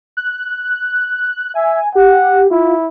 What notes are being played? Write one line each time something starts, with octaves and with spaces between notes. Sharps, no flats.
F#6
E5 G#5
G4 F#5
E4 F4